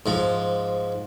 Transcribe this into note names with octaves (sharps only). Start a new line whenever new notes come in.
G#2 F3